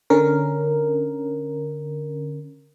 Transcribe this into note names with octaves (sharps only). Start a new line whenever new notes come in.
D3 C#4 A#4